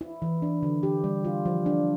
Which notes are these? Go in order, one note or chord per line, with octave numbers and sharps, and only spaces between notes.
E4
E3
D4
D3
G4
G3
F4
F3
D4